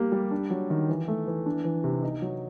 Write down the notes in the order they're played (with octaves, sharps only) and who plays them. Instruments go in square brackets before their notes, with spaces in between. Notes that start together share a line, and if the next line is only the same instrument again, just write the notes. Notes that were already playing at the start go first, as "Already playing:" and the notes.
Already playing: [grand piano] G3 A#3 G4
G3
D4
F#3
D#3
E3
A3
E3
D4
E3
C3
D#4
F#3